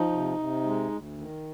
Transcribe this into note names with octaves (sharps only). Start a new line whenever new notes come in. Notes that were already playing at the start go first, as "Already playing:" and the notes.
Already playing: F3 D#4
C3
C3
G#3
D2
D#3